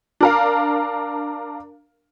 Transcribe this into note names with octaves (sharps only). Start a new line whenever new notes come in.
D4 A#4 F5